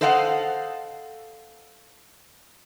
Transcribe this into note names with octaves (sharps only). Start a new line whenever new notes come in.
A4 C5 D#5 F5 F#5